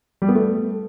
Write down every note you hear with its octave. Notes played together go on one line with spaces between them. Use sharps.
G3
B3
A3